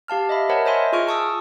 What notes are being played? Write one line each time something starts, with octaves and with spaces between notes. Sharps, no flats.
G4 F5 A5 F6
D#5 E5 B5
A#4 C5 C#5 F#5 A5 B5
C5 D#5 E5 G#5 C6
F4 G#4 G#5 C#6 F6 D7
A5 C#6 D#6 E6